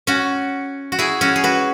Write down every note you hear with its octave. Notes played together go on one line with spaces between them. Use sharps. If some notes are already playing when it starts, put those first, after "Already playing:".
C#4 F#4
F#4
E4 G#4
C#4 F#4
G#4
F#4 B4